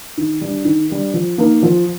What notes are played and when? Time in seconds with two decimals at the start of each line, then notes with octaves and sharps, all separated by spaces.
0.17 D#3
0.41 G3 D4
0.65 D#3
0.90 G3 D4
1.14 F3
1.38 A#3 D#4 A#4
1.63 F3